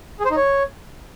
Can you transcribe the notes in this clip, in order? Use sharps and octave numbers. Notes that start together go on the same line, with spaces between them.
G#4
C5
D#4
C#5